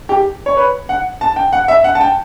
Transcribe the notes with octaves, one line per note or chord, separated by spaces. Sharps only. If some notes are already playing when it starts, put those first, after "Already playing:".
G4
C#5
B4
F#5
A5
G5
F#5
E5
F#5
A5
G5